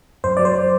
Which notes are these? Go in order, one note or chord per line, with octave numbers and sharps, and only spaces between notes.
F#2 C5
F#3 D5
C5
F#3